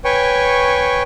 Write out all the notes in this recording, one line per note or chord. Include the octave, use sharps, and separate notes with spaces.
B4 C#5 G5 G#5 C#6